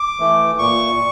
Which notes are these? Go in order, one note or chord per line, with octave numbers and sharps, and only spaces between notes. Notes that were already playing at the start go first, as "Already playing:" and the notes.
Already playing: D6
E3 A3
A#2 C#6